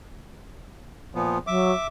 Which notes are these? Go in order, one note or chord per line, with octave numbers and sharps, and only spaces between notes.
A#2 F3 B3
F#3 E5 D6